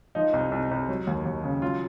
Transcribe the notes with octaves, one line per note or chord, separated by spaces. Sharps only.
F3 D#4
C2
C2
C2
F#3
D#2
D#2
C#3
F#3 F4